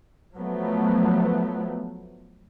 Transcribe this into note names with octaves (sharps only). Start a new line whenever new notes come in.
F3 F#3 A3 B3